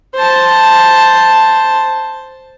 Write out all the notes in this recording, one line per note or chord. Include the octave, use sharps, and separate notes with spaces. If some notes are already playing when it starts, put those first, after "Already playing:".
C5 A5